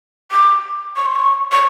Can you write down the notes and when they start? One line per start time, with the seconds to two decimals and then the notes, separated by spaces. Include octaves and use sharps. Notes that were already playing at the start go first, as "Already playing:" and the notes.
0.32 D6
0.96 C#6
1.06 C6
1.16 C#6
1.52 C#6